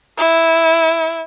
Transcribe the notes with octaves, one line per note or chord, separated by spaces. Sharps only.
E4